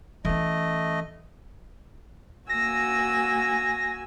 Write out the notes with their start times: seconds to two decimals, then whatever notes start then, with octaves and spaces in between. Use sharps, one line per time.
0.25 E3 A3 C#4 D#5
2.49 A#3 F#4 G#5 E6 A#6